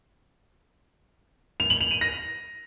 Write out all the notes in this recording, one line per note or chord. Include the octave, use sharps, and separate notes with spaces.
F7
F#7
F7
D#7
A#6